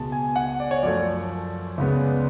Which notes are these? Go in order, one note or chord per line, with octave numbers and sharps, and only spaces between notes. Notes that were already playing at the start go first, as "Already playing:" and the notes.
Already playing: C#2 B2 G#3 A5
G#5
F#5
D5
C#5
F#2 F3 A3 D5
C#2 C#3 G#3 B3